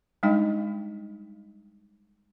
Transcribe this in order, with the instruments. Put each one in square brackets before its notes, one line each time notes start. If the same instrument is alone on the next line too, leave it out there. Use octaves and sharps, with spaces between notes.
[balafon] G3 G#3 D4 D#4 D#5 G5